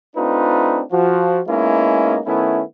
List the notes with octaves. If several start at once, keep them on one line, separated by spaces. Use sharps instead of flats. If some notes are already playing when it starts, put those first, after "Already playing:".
A3 C4 D4 D#4 F4 B4
F3 F#4
G#3 A#3 B3 C#4 D#4 E4
D#3 A3 B3 C#4 E4